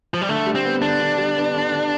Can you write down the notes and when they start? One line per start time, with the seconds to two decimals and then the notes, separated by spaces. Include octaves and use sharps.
0.14 F3
0.21 G3
0.29 D3 A3
0.46 G3
0.55 C4
0.65 B3
0.82 D3 D4
1.00 D3
1.18 G3
1.36 B3
1.54 D3
1.72 D3